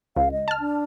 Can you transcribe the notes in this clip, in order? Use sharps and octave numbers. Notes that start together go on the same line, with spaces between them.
C#2 F5
D#5
A5 F6
D4